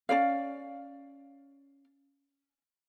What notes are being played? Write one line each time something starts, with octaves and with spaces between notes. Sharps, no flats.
C#4 F4 D5 F5